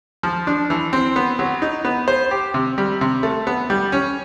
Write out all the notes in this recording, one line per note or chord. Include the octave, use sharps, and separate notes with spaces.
F3
D4
E3
C4
B3
F#3
D#4
B3
C5
G4
C3
G3
C3
A3
B3
G3
C#4